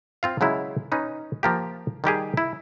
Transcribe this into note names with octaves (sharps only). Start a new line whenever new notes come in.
C4 F4 F5
C#3 F#3 G#3 E4
C#4 D#4 B4
F3 A#3 G4
D#3 G3 G4 G#4
E4